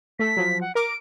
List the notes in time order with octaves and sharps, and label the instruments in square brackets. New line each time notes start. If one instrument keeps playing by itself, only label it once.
[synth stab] A3 A4 [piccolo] B6
[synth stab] F3 F#3
[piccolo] F#5
[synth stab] A#4 D6 [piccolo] D7